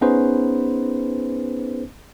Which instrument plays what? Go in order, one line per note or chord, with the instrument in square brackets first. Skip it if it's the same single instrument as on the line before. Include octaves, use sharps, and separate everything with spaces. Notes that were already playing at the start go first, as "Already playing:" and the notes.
[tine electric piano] B3 C#4 D#4 G#4 B4 C5